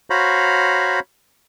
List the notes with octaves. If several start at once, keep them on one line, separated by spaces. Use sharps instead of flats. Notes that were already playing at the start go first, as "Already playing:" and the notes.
F#4 C5 C#5 F5 A#5 B5